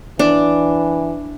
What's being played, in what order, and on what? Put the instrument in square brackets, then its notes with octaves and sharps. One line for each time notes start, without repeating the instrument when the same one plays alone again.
[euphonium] E3 [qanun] D4